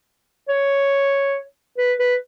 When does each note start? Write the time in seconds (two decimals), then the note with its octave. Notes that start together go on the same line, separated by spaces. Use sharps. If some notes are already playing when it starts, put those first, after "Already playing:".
0.49 C#5
1.78 B4
1.99 B4